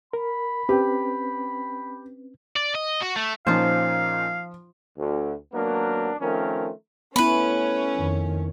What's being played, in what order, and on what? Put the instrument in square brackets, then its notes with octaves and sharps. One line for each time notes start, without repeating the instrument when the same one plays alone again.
[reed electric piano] A#4 [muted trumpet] B5
[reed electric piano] C4 C#4 B4 [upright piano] G4
[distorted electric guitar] D5
D#5
F#4
A3
[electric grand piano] A#2 C#4 D#4 [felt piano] F3 [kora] F4 C5 [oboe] F5
[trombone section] D2
G#1 F#3 A#3 B3 D4 A#4
D#3 F3 A3 C4 C#4 A#4
[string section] A3 C#4 [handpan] B3 E4 [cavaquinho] B4 B5
[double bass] F2 D#3